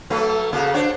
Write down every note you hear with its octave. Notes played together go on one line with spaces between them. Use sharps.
F#3 A3 A4 B4
C#3 A#3 F#4 A4
D4 F#4 C5 C#5